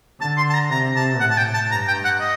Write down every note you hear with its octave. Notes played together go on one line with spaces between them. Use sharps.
D3 A5
C6
A5
A#5
C3 A#5
A5
A2 F#5
A5
G5
A5
G2 A#5
G5
F#5
D#5